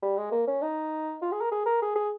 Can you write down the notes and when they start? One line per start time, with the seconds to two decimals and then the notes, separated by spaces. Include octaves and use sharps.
0.02 G3
0.18 G#3
0.32 A#3
0.47 C#4
0.62 D#4
1.22 F4
1.32 G#4
1.41 A#4
1.52 G#4
1.66 A#4
1.82 G#4
1.96 G#4